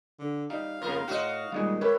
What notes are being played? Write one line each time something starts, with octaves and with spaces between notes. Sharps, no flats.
D3
G3 D#4 F5
F2 C#3 A#3 A#4 C6
A2 F#4 D#5
D#2 A#2 G3 G#3 G#4
E4 G4 A#4 B4 C#5